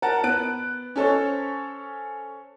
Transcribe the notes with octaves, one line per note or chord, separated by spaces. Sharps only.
A#4 F#5 A5
B3 F#6 D7
C#4 A4 C5 C#5